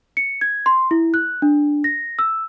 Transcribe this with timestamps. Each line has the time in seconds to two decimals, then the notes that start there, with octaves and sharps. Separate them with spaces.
0.17 C#7
0.41 G#6
0.66 C6
0.91 E4
1.14 F#6
1.42 D4
1.84 A#6
2.19 E6